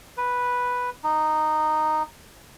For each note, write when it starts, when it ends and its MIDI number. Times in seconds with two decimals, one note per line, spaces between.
0.17 0.90 71
1.04 2.03 63